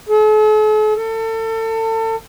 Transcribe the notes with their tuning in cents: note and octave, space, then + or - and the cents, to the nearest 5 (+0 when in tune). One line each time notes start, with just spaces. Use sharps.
A4 -45
A4 +30